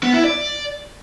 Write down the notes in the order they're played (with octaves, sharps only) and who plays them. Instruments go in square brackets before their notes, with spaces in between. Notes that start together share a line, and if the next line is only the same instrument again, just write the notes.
[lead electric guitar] B3
E4
D5